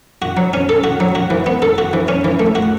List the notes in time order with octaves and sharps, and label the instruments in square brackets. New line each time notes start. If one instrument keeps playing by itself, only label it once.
[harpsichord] F#4
F#3
C#4
A4
F#4
F#3
F#4
E3
B3
A4
F#4
E3
C#4
E3
A3
F#4